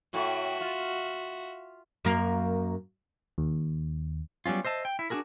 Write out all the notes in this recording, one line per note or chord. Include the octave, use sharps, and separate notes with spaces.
A2 F#4 E5
F4
F#2 A#3
D#2
F#3 G3 B3 C#4 F4
C5 D#5 E5 A5
G5
E4
D4 F4 F#4 G#4 A#4